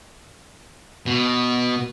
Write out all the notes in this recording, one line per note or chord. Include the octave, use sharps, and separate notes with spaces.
B2